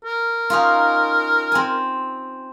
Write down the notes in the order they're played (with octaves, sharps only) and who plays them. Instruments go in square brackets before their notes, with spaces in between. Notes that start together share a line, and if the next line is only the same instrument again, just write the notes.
[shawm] A#4
[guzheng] C#4 D#4 F4
C4 G#5